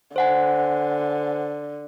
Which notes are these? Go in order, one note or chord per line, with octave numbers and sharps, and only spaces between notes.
D3 C5 F#5 G#5